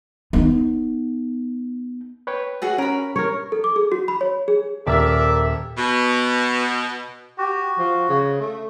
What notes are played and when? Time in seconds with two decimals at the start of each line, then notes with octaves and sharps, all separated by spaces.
0.33 B3 D#4
2.27 B4 C#5 G5
2.62 F#4 G#4 F#5
2.78 C#4 A#4 B5
3.16 A#4 C#5
3.52 A4
3.64 D6
3.76 G#4
3.92 F#4
4.08 B5
4.21 C#5
4.48 G#4
4.87 D#1 A#4 D5 E5
5.78 B2
7.38 F#4 G4
7.79 F3
8.09 C#3
8.41 A3